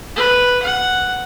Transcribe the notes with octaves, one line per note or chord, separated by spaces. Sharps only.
B4
F#5